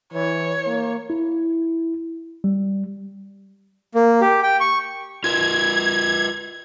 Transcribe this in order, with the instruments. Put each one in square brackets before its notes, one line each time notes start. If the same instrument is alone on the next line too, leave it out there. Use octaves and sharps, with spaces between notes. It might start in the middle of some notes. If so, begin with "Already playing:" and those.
[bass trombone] E3 [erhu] C#5
[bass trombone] A#3
[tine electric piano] E4
G3
[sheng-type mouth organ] A#3
G4
G5
C#6
[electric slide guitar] F4 A#4 B4 [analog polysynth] G#6